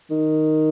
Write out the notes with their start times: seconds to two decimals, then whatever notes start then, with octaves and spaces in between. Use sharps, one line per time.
0.11 D#3